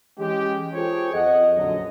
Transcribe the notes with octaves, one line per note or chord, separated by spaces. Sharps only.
E3 G#3 C#4 G4
F4 G#4 A4 C5 C#5 G5
F2 D#5 F#5
A#1 F#2 D3 F#3 D#5